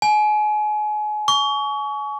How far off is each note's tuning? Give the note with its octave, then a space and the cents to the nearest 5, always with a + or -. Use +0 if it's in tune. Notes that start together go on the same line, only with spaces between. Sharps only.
G#5 +30
C#6 +30